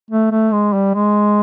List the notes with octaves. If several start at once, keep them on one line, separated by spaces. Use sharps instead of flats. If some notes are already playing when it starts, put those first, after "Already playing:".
A3
A3
G#3
G3
G#3